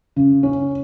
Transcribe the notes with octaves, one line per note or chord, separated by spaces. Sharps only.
C#3
C#4